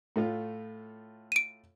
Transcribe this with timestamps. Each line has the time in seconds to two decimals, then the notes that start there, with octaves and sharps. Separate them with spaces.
0.16 A2 A3 F4
1.32 D7 D#7